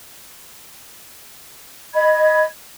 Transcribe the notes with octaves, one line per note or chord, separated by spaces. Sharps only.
D#5 B5 G#6